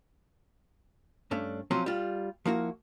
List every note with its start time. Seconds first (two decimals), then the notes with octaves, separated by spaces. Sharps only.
1.31 G2 A3 C#4 D4
1.71 F3 F#3 C4 C#4 F4 F#4
1.86 G3 F4
2.45 F3 A#3 E4 F#4